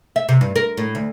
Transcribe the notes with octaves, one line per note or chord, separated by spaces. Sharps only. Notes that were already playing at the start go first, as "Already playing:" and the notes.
E5
C3
G2
A#4
A2
D2